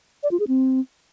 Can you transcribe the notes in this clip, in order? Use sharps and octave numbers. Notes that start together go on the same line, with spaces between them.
D5
F4
G#4
C4